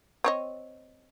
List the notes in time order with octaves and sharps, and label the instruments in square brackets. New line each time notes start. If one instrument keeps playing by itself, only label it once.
[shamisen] C4 C#5 D#5